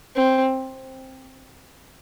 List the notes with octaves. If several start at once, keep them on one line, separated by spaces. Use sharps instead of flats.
C4